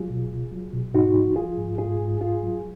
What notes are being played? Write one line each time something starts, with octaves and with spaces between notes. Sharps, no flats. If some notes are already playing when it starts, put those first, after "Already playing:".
Already playing: F#3 F4 G#4
B2
C#2
F#3
B2
G#2 D#4 F#4
F3
F3 F4 G#4
G#2
G#2 F4 G#4
G#2
G#2 F4 G#4
F#3